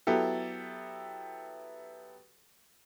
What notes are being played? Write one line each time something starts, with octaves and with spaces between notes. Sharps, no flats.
F#3 B3 E4 G4 A4